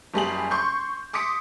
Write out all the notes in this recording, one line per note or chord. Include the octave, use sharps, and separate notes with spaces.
F#1 G3 G#4 F#7
C6 C#6 G6
C6 D6 D#6 B6 C#7